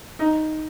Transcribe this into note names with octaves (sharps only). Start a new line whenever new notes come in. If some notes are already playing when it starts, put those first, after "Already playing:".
D#4